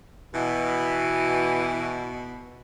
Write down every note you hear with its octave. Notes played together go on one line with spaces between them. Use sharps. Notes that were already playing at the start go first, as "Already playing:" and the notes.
B2 E3